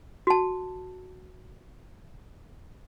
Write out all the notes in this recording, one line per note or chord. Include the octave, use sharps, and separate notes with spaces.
F#4 A5